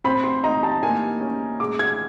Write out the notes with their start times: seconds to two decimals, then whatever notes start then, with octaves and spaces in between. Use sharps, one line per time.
0.04 C4 B5
0.24 C6
0.44 D#4 A#5
0.63 A5
0.83 A#3 G#5
1.21 C#4
1.60 G#3 D6
1.79 G#6